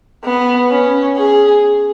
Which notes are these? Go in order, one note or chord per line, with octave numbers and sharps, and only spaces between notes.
B3
C#4
G#4